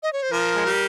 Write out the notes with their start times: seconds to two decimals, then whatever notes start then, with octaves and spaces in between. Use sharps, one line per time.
0.03 D#5
0.13 C#5
0.23 C5
0.32 F3 A#4
0.56 G#3
0.66 G3